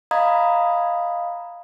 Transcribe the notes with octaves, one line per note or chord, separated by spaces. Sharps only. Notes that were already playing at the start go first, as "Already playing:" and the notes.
D#5 F5 A#5 B5 D#6 G#6